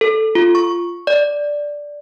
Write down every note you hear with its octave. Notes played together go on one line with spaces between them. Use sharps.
A4
F4
C#6
D5